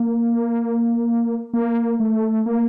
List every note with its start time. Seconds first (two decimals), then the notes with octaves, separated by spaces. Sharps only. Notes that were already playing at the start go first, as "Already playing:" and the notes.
Already playing: A#3
1.54 A#3
2.00 A3
2.46 A#3